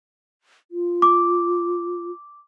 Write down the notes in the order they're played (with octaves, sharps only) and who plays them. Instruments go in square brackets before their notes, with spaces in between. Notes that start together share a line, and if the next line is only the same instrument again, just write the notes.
[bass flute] F4
[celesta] D6